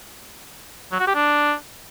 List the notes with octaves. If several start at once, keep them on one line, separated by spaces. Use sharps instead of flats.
F#3
F#4
G4
D4